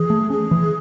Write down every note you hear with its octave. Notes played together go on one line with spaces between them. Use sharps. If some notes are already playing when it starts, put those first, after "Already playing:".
Already playing: E3 G#4
A3
C#4 G#4
E3